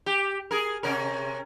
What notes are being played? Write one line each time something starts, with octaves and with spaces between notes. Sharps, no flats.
G4
G#4 A#4
C3 C#4 A#4